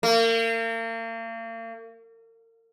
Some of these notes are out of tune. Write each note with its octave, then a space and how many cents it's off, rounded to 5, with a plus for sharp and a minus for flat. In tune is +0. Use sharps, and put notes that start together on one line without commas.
A#3 -40